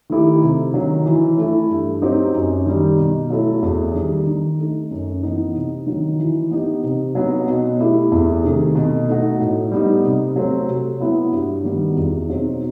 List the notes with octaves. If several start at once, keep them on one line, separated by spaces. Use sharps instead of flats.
D#3 A3 E4 G4
C3
D#3 F#3
E3
A3 E4
G2
F#3 C4 D#4 G4
F#2
D#3 G3
B2
F#3 A3 E4
E2
D#3 G3
D#3
A3 D#4
F#2
E3 B3 D#4
C3
D#3 F#3
E3
B3 D#4 G4
C3
F#3 B3 D#4
B2
A3 E4 G4
E2
C3 D#3 A3
B2
A3 D#4 F#4
A2
G3 B3 D#4
C3
F#3 A3 C4
C3
F#3 B3 E4
G2
D#3 G3 B3 F#4
E2
B2 F#3 C4 D#4